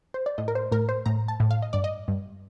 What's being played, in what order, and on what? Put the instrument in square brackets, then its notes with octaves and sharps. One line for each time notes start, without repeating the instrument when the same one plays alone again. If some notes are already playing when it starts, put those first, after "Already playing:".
[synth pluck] C5
D5
A2 D#5
A#4
C5
A2 A#4
C5
A2 A#5
A5
A2
F5
D#5
G2 D5
D#5
G2